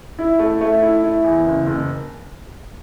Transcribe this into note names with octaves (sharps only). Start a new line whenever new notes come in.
E4
A3
A3
E4
E4
E2
F#1
F#1